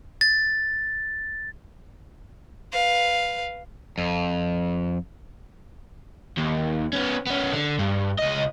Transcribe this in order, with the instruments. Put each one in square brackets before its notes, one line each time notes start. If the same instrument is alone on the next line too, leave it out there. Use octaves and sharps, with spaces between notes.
[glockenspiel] A6
[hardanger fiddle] B4 F5
[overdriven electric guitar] F2
D#2
B3 C#4
B3 C#4
D3
G2
C#2 D#5